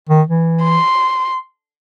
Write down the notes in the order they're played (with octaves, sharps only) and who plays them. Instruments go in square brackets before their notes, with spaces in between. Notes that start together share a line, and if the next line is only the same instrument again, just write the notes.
[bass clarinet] D#3
E3
[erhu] C6